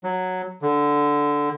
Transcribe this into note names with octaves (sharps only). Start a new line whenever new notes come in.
F#3
D3